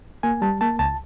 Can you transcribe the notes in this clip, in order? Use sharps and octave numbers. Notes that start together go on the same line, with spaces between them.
A#3 G#5
G3 A5
A#3 A5
C#2 A5